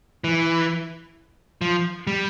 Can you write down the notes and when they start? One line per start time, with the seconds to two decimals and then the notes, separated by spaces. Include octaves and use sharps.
0.24 E3
1.61 F3
2.07 G3